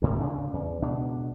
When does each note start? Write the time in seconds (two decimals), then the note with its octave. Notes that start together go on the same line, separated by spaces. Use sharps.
0.02 D2 G#2 C3
0.21 D2 C#3 D4
0.53 E2
0.82 C#2 B2 D4